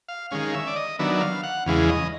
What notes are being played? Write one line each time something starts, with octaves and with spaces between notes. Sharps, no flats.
F5
D#3 G#3 C#4 F5
E5
D5
D#5
D#3 F#3 B3 D4 E5
E5
F5
F#5
E2 C#3 E3 G#3 F5
D#5